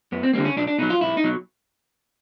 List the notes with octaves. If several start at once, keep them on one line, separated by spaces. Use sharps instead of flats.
F#2 B3
C4
D3 G3 A#3 C4
C#4
B1 D4
D4
B2 F#3 D#4
F4
B1 E4
D#4
B2 F#3